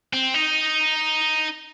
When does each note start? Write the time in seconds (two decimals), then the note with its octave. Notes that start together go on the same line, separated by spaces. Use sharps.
0.13 C4
0.34 D#4